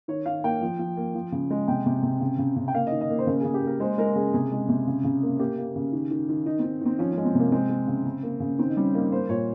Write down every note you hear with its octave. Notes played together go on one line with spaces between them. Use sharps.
D#3 C#5
D#3 F5
A#3 G5
F3
F3
A#3
F3
C#3
G#3
C3 G5
C3
C3
C#3
C#3
C#3
G5
A#3 F5
D#5
D#3
D#5
A#3
C5
C#3 A#4
C#3 G#4
G4
A#3 A#4
G#3 C5
G#3 A#4
C#3 G#4
C3 G#4
G#3
C3
C#3
C#3
A#3
A#3 G4
A#3
C#3
D#3
D#3
D#3
D#3 D#4
C4
D#3
D#3 C4
F3 C#4
C#4
G#3
C4
C3 A#3
G#3 C4
G#3
C#3
C#3
A#3
C#3
D#3 C4
D#4
G3 C#4
A#3 D#4
A#3 C5
A#2 C#5